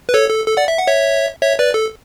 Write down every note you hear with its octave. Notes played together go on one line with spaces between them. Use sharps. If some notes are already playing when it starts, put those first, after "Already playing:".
B4
A4 C#5
A4
A4
D5 F#5
E5
F#5
C#5 E5
C#5 E5
B4 D5
A4